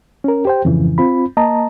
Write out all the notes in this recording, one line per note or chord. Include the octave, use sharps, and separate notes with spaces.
C#4 A#4
G4 C5 G5
F2 G#2 C#3 E3
C4 F4 B5
A#3 D#5 A5 A#5